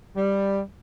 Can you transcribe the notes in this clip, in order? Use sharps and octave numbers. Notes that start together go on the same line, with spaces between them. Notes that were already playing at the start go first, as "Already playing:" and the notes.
G3